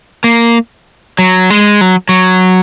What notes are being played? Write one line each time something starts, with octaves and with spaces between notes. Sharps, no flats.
A#3
F#3
G#3
F#3
F#3